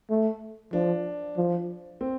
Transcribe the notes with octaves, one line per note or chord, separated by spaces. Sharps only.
A3
F3 D4
F3
C4